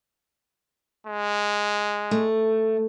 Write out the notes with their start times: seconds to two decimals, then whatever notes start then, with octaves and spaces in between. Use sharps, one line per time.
1.07 G#3
2.11 A3